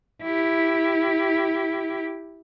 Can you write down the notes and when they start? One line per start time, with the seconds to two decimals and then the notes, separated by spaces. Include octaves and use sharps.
0.23 E4 G4